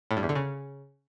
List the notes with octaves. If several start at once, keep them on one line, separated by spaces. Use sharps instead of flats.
A2
G2
E2
D3
C#3